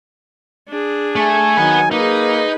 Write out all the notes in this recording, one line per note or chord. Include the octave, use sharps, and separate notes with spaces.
D4 G#4
A3 G#5
D#3 F#3 B4 F#5
A#3 D#4 G#4 B4